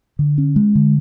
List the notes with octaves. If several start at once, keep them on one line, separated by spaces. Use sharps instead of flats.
D3
C#4
G#3
D3